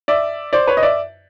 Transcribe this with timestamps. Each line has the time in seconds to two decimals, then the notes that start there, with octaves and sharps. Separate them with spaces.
0.08 D5 E5
0.53 C5 D5
0.67 B4 C#5
0.77 D#5
0.83 D5 E5